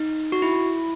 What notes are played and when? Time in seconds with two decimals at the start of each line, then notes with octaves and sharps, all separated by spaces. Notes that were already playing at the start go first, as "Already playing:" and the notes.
Already playing: D#4
0.32 F#4
0.42 E4